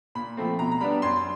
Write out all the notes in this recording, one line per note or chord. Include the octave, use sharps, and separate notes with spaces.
A#2 B5
F3 A3 C4
B2 A#5
A#5
G3 B3 D4 B5
F#2 C6